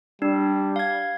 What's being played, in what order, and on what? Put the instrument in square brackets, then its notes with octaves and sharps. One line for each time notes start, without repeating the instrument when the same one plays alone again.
[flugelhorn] G3 [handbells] D4
[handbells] F5 G#6